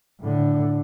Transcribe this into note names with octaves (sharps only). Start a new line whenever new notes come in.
A2 D3